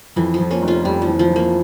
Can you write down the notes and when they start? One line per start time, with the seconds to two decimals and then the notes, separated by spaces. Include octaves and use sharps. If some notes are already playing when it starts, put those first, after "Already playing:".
0.16 F2 E3
0.34 F3
0.40 F2
0.51 A#3 C#4
0.62 F1
0.68 C#4 F4
0.85 F2 G3
1.02 F3
1.07 E3
1.19 F3
1.30 E3
1.36 A#3